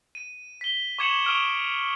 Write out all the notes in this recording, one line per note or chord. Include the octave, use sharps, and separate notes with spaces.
D#7
B6 G7
C#6 D6 G#6 C#7 E7 F#7
C#6 D#6 F6 D7